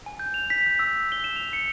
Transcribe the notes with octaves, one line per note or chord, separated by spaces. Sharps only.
G#5
G6
F7
B6
G6
E6
G7
E7
F7
C#7